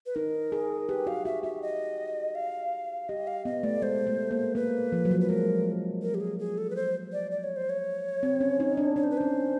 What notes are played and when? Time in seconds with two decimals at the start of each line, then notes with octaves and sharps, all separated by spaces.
0.06 B4
0.15 D#4 A#4
0.52 G#4
0.89 G4 B4
1.07 F#4 F5
1.25 F#4 E5
1.43 F#4 E5
1.62 D#5
2.35 F5
3.09 G4 D#5
3.27 F5
3.45 B3 D#5
3.63 A3 D5
3.82 G#3 C5
4.07 A3
4.31 A#3
4.55 A#3 B4
4.92 F3
5.05 F#3
5.11 F3
5.21 B4
5.29 G#3 A#4
6.02 A#4
6.15 G4
6.20 G#4
6.39 G#4
6.58 A4
6.70 B4
6.76 C5
7.13 D5
7.31 D5
7.44 C#5
7.56 C5
7.70 C#5
8.23 C4
8.40 C#4
8.60 D#4
8.77 D4
8.96 D4 C#5
9.04 C5
9.10 B4
9.17 C#4 C5